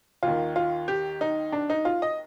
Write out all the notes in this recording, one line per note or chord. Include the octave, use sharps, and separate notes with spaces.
D#2 D#3 F4
F4
G4
D#4
D4
D#4
F4
D#5